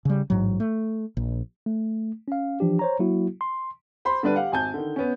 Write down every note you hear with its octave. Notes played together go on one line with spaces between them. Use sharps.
C#3 G3
A1 G#2 F#3
A3
A#1
A3
C#4 F5
E3 F3 D4 G4
C5 C#5 A#5
F#3 A#3 E4 F#4
C6
C5 B5 C6
D3 G3 D4 B4
G4 F5 F#5
G#1 G#5 A5 G6
D3 D#3
B3 C#4